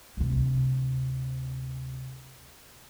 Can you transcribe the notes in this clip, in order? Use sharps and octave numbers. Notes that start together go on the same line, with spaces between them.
D2 C3